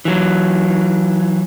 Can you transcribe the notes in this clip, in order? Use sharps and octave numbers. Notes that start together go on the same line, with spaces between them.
E3 F#3